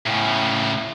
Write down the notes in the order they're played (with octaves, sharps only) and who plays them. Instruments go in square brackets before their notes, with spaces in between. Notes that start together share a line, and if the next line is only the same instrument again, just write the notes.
[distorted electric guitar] A2 C#3